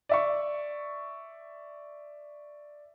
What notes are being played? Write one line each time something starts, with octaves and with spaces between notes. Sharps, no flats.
D5 E5 C#6